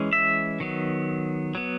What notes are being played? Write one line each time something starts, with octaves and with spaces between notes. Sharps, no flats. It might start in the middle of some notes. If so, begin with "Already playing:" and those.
Already playing: E3 G#3 C#4
E5
D#3 F#3 B3
F#3 B3